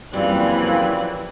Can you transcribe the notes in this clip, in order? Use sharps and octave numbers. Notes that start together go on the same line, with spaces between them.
F#2 A#2 C#3 E3 F3 G3 C4 F#6